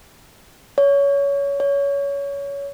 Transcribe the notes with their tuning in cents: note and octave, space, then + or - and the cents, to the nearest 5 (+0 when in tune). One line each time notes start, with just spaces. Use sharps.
C#5 +20
C#5 +20